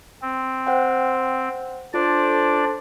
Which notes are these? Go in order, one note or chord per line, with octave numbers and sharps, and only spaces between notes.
C4
C5 F#5 G5
D4 F4 A4 C5 D5